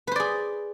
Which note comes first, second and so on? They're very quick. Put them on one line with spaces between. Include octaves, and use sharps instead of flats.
B4 C5 D5 G#4